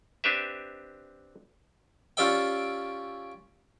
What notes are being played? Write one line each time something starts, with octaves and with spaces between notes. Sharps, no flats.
C4 D4 G4 B4 E5
C#4 F4 G4 D5 E5 G5